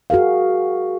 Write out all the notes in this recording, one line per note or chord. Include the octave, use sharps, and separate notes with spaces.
F#4 G#4 A#4 F5